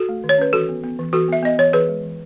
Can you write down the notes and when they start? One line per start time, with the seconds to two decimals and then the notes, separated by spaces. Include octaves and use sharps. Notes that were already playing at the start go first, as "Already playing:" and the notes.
Already playing: F#4 A4
0.09 A3
0.24 D#3
0.29 C#5
0.38 C#4 B4
0.53 E3 F#4 A4
0.69 B3
0.84 B3
0.99 E3
1.13 E3 F#4 A4
1.29 B3 E5
1.43 B3 D#5
1.59 E3 C#5
1.73 E3 G#4 B4
1.89 G#3
2.03 E3